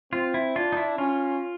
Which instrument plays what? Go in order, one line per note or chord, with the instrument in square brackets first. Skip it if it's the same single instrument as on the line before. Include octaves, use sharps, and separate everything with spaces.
[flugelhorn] C4 [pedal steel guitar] F4
[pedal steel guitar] E4
[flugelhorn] D4 [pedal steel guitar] F4
[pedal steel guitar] D#4
E4
[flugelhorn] C#4 [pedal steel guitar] F4